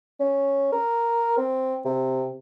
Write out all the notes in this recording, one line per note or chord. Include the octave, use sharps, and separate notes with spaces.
C#4
A#4
C4
C3